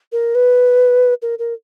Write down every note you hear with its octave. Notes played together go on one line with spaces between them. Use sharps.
A#4
B4
A#4
A#4